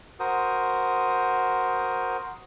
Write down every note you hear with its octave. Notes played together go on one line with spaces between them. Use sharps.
F#4 A#4 C5 D#6